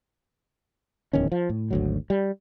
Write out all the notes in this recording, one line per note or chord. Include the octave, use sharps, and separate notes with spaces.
D1 E2 D#3 C#4
F3
A2
G#1 D2 F#3
G3